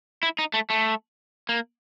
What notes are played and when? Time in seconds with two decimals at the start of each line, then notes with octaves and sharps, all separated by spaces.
0.23 E4
0.39 D#4
0.54 A3
0.70 A3
1.49 A#3